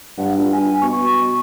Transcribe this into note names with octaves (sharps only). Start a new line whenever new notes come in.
G2 F#5
G2 F4
G#5
B2 C#6